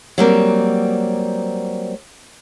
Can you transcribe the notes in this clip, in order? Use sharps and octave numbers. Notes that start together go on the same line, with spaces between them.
F#3 G3 A#3 C4